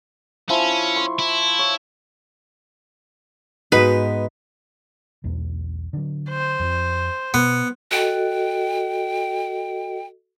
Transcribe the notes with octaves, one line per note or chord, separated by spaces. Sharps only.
F3 C#4 E4
C6 C#6
E4
C#5
G#2 G#3 B3 D#4 F#4 G#4 B4
B1 E2 A3
D3 F#3
C5
F2 F3
B2 B3
F#4 A4 D#5 G5